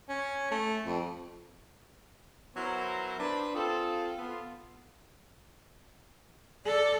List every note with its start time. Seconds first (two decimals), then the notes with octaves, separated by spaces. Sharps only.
0.09 C#4
0.51 A3
0.86 F2
2.55 F#3 B3 C#4 E4 A#4 C5
3.20 D4 B4 C5
3.55 C4 F4 G#4 A4
4.19 B3 F4 A4
6.65 A4 D5